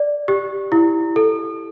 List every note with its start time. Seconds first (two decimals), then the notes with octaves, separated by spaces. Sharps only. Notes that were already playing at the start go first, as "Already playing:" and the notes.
Already playing: D5
0.28 G4
0.72 E4
1.16 A4